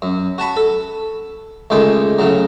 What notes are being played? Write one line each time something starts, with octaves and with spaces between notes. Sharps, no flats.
F#2
F#4 A5 B5 C#6
A4
C#2 D#3 G#3 A3 D6
A2 C#3 F#3